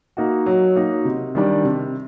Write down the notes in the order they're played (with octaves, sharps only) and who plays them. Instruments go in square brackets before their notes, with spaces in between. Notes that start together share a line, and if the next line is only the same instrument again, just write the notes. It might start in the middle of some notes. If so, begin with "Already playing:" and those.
[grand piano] A#3 D#4 F#4
F#3
A#3 D#4 F#4
C3
D#3 G3 D4
C3